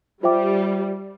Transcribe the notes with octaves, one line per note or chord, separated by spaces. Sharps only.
G3 F4 C5 E5 G5 D6